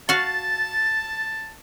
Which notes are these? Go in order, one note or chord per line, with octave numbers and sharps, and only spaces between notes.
F#4 F5 A5 A6